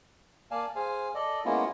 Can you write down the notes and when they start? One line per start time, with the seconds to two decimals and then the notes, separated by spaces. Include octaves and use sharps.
0.51 A#3 D5 F5 G#5 A5
0.75 G#4 C5 F5 G#5
1.15 A4 D5 D#5
1.45 G#3 A#3 B3 C#4 E4 F4